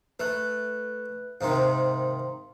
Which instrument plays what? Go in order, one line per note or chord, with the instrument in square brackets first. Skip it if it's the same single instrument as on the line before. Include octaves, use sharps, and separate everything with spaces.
[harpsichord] A3 [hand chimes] B4 F#6
[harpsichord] G#2 C3 D#3 [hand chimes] F5 C6